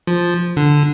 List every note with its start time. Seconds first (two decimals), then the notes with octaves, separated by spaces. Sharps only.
0.07 F3
0.57 D3